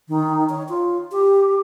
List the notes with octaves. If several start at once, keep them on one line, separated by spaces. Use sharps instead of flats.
D#3
C#5
F4
G4